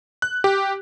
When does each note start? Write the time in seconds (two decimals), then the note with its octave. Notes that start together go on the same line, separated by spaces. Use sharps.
0.22 F#6
0.44 G4